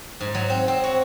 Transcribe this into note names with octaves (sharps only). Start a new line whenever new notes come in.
G#2
F#3
C4
C4
F#4